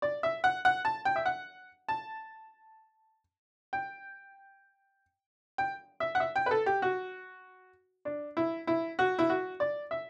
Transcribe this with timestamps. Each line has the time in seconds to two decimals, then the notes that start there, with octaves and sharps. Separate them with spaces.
0.02 D5
0.23 E5
0.44 F#5
0.65 F#5
0.85 A5
1.05 G5
1.16 E5
1.26 F#5
1.89 A5
3.73 G5
5.58 G5
6.00 E5
6.15 F#5
6.20 E5
6.36 G5
6.46 B4
6.51 A4
6.66 G4
6.82 F#4
8.05 D4
8.37 E4
8.67 E4
8.99 F#4
9.19 E4
9.30 F#4
9.60 D5
9.91 E5